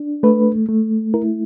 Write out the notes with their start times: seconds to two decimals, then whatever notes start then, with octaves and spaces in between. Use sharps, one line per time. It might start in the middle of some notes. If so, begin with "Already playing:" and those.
Already playing: D4
0.23 A3 B4
0.69 A3
1.14 E4 A#4